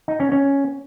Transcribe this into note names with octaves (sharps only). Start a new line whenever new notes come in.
D#4
C#4
C#4